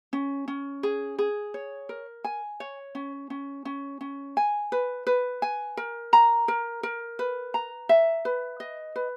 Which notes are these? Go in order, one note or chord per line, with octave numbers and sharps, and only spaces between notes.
C#4
C#4
G#4
G#4
C#5
A#4
G#5
C#5
C#4
C#4
C#4
C#4
G#5
B4
B4
G#5
A#4
A#5
A#4
A#4
B4
A#5
E5
B4
D#5
B4